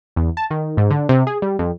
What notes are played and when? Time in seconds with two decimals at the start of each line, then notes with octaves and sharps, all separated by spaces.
0.16 E2
0.37 A5
0.51 D#3
0.77 G#2
0.91 D3
1.09 C3
1.27 G#4
1.42 G3
1.59 F2